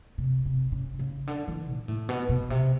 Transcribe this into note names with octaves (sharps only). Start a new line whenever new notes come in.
C3
C3
C#3
C#3
D3
E3
A#2
A2
B2
B2
C3